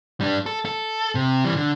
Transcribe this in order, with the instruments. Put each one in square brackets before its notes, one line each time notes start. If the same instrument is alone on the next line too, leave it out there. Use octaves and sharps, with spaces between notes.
[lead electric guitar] G3 D4
A4
A4
C3
E3 G3
D3